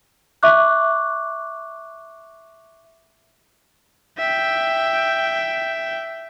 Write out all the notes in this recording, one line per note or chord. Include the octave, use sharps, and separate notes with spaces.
E5 C#6 D6 F#6
E5 G5